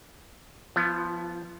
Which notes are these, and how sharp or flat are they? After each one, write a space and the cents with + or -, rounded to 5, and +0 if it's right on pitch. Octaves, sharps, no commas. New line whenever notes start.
F3 +0 B3 +15 F4 -40